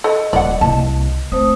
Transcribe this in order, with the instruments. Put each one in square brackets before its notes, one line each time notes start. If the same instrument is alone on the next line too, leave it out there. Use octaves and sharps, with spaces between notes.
[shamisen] A4 [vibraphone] D#5
[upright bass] D#1 [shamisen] D5 F#5
[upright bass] C2 A#3 [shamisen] A5
[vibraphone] A3 C5 D#6 [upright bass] C4